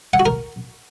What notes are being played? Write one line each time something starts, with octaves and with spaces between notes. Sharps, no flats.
F#5
F#4
A#4